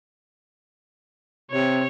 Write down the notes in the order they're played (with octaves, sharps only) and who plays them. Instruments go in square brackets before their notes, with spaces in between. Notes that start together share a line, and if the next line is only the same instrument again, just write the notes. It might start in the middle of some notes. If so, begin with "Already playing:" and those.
[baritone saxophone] C3 [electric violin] C#5